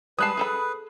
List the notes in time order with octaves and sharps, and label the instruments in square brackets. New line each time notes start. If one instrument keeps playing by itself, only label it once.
[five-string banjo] G3 G#3 A5 [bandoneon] B4 [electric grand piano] D#6 F#6 C7
[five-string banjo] G#4 A4 B5